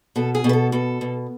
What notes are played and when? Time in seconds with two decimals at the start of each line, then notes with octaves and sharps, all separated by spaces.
0.16 B2 A4
0.35 G#4
0.44 B2
0.49 B4
0.53 A4
0.72 B2 A4
1.01 B2